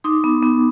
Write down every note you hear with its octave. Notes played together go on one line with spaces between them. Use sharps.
D#4 C6 D6
B3
B3